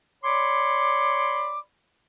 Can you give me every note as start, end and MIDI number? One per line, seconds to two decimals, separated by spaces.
0.24 1.59 73
0.24 1.59 74
0.24 1.59 83
0.24 1.59 84
0.24 1.59 86